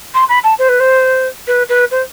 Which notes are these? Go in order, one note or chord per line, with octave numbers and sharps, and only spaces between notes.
C6
B5
A5
C5
B4
C5
B4
B4
C5